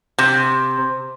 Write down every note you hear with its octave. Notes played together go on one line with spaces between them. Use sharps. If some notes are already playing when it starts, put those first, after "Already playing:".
C3